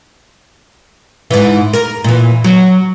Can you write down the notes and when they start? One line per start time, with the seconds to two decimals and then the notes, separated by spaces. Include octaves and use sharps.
1.31 G#2 E3
1.73 A#4
2.04 A#2 E3
2.44 F#3